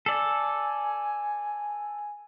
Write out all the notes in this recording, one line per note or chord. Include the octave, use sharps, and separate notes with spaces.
A4 D5 G#5